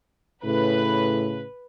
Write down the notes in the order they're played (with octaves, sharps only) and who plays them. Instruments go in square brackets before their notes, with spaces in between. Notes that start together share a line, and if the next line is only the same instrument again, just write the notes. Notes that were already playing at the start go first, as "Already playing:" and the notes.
[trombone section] A2 C#3 [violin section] B4